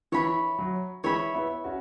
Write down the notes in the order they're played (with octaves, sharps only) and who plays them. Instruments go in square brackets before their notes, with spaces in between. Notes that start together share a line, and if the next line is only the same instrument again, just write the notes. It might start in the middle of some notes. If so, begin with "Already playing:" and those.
[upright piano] E3 [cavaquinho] C#5 E5 B5
[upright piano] F#3
[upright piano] E3 G#3 [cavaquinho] C#5 E5 B5
[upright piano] B3 E4
C#4 F#4